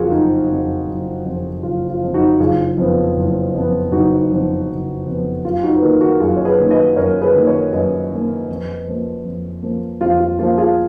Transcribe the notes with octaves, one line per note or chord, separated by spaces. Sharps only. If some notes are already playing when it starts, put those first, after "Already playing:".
Already playing: F#1 F2 F3 F4 F#4 G#4 A#4
F#1 D#4
F2 F3
F#1
F2 F3
F#1 F4
F4
F2 F3
D#4 F#4
F#1 F4 G#4
F2 F3 B3
F#1
F2 F3 B3
F#1 D#4 F#4
F2 F3 B3
F#1
F2 F3 B3
F#2 F4
D#4 F#4
B4
D#3 A#3 F#4 A#4
F#4 A#4
F#2 F4 G#4
C#5
G#4 B4
D#3 A#3
B4 D#5
F#2 A#4 C#5
G#4 B4
D#3 A#3
A#4 C#5
F#2 B4 D#5
D#3 A#3
F2
F3 A#3
F2
F3 A#3
F2 F4
F4
F3 A#3 F4
F4 G#4